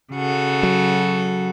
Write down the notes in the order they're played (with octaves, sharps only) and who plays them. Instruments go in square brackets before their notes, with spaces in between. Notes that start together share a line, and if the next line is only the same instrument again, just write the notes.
[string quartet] C#3 F#4 A4
[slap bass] F#3